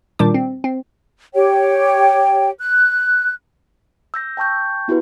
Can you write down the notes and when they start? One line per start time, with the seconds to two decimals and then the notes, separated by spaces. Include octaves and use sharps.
0.19 A#2 D#3 G3 D4 D6
0.34 C4
0.64 C4
1.34 G4 C#5 G5
2.59 F#6
4.14 E6 G6 A#6
4.37 G5 A5 C#6 G6
4.88 B3 E4 F#4 G4 B4